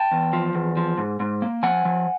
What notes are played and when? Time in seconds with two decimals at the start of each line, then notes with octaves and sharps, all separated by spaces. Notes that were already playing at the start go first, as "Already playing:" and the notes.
Already playing: G5 A5
0.11 E2
0.33 F3
0.55 E2
0.77 F3
0.98 G#2
1.20 G#2
1.42 A#3
1.63 F3 F#5 G#5
1.85 F3